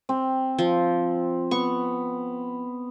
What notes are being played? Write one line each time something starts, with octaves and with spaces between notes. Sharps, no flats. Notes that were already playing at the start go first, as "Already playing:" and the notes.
C4
F3
B3 C#6